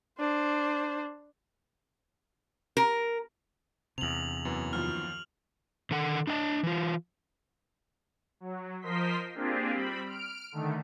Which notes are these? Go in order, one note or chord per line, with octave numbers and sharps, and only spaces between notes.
D4 C5
A#4
E2 C3 F7 F#7
F#2 E3 B3
D#2 F3 F6
D3 D#3 A4 F#5
D4 D#5 F#5 A5
E3 F4
F#3
F3 A#4 C5 D#5 C6 B6
A#3 C4 D4 F4 G4 G#4
G3 C4 B5
F6 D7
D3 D#3 A3